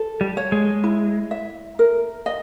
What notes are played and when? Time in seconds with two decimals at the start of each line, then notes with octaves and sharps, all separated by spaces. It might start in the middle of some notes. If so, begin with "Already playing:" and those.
Already playing: A4
0.21 G3
0.37 C#5
0.52 G#3
0.84 E4
1.31 E5
1.79 A#4
2.26 D#5